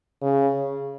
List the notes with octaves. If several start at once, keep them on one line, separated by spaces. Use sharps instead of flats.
C#3